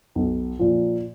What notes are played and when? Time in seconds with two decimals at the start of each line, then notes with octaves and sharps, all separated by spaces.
0.15 B1
0.59 A#2 F3